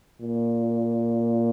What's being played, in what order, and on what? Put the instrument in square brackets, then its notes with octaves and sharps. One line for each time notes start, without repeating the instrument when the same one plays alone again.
[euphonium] A#2